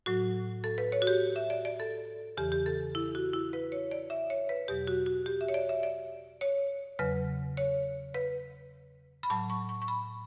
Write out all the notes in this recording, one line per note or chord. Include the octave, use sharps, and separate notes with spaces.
A2 F#3 F#4
A4
B4
C#5
F#4
G4
E5
D5
D5
A4
E2 C#3 E3 G4
G4
A4
E4
F#4
E4
B4
C#5
D5
E5
C#5
B4
E2 B2 F#3 G4
F#4
F#4
G4
E5
C#5
D5
E5
D5
C#5
E2 C#3 F#3 B4
C#5
B4
B5
A2 F#3 A5
C#6
C#6
C#6
B5